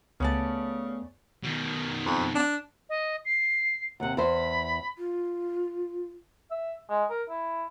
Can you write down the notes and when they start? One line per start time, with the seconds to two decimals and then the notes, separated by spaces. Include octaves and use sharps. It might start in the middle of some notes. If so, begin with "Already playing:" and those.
0.20 C#2 C#3 A3 B3 C#4 D5 A5
1.43 B2 D#3
2.05 F2
2.35 D4
2.89 D#5
3.25 C7
4.00 D#2 C3 F#5
4.17 E2 C5 B5
4.98 F4
6.51 E5
6.90 G#3
7.10 A#4
7.30 E4